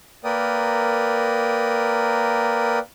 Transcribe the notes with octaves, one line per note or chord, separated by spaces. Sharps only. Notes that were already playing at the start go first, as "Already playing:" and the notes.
A#3 A#4 B4 D5 G5 D#6